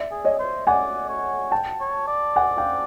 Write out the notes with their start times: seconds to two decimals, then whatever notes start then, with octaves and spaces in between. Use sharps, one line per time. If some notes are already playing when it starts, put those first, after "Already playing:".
Already playing: D5 E5
0.11 G#4
0.24 C#5 D#5
0.39 C5
0.67 D5 F#5 G#5
1.09 C#5
1.51 G5 A5
1.81 C#5
2.08 D5
2.36 F#5 G#5
2.58 F5 G5